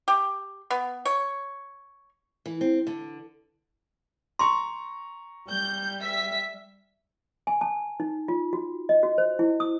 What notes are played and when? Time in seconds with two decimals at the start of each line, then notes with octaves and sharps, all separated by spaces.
0.08 G4
0.71 B3
1.05 C#5
2.46 E3
2.61 C4
2.87 D3
4.39 A#5 C6 C#6
5.50 G3 G6
6.01 E5 B6
7.47 G#5
7.61 A5
8.00 D#4
8.28 F4
8.53 F#4
8.89 D#5
9.03 F#4
9.18 C5
9.39 E4
9.60 D#6